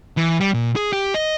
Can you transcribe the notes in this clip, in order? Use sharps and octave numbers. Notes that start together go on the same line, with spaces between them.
E3
G3
A#2
G#4
G4
D#5